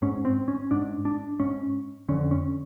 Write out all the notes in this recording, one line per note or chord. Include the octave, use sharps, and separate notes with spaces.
G#2 C#4
C4
C#4
G#2 D4
D4
G#2 C#4
F2 D3 C#4
C#4